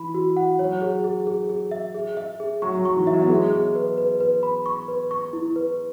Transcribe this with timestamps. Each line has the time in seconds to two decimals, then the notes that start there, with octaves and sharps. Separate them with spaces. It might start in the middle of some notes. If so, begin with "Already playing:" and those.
Already playing: E3 B5
0.14 F#4
0.37 F#5
0.59 F#3 C#5
0.82 G#4
1.04 G#4
1.27 G#4
1.49 G#4
1.71 E5
1.95 G#4
2.17 E5
2.40 G#4
2.62 F#3 C#6
2.79 F#3
2.85 C#6
2.96 E3
3.07 E5
3.13 F#3
3.22 B3
3.30 G#3 G#4
3.53 G#4
3.75 B4
3.98 B4
4.20 B4
4.43 B5
4.66 C#6
4.88 B4
5.11 C#6
5.33 E4
5.56 B4